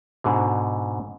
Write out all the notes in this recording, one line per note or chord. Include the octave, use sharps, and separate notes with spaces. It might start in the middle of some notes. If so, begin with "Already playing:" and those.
G#2 B2 D3